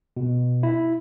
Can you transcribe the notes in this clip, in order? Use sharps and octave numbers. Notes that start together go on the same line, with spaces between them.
B2
E4